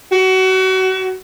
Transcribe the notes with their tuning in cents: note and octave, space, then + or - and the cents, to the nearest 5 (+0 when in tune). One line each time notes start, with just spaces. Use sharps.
F#4 +30